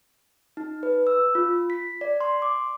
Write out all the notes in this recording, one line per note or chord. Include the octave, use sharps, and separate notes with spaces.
D#4
B4
E6
F4
B6
D5
C6
D6